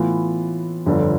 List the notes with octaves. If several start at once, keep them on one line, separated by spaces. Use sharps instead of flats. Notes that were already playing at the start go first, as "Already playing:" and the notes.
Already playing: A2 E3 B3 F4
G1 F2 D3